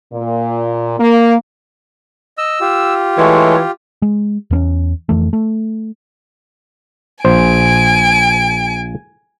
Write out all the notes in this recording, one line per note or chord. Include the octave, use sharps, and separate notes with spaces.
A#2
A#3
D#5 E6
F4 G4
E3 G#3 A3 C#5
G#3
E2 B3 C#4
F2 E3 A3
A3
A#1 C5 G#5 D7